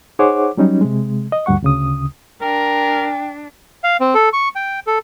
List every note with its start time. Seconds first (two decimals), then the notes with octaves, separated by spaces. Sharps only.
0.19 D#4 G#4 C5 C#5 F#5 D6
0.57 F#3 G3 C#4 D#4
0.81 C3 G#3
1.32 D#5
1.46 D2 G2 G3 F#5 C#6
1.63 D2 C#3 D#6
2.42 D4 A#4 G5
3.84 F5
4.00 C4
4.15 A4
4.33 C#6
4.56 G5
4.87 A4